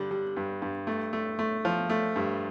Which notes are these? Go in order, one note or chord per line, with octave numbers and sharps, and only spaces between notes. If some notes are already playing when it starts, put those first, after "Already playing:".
Already playing: G2 D3 G3
G3
G2
G2
A3
A3
A3
F3
A3
G2